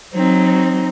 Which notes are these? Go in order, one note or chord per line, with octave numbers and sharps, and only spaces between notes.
F#3 C4 D#4